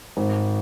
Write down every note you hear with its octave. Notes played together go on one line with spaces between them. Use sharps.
G#1